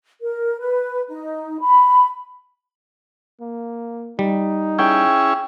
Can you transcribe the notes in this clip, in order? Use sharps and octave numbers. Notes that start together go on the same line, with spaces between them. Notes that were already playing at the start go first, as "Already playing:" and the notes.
A#4
B4
D#4
B5
A#3
G3 D#4
C#4 E4 G#4 G5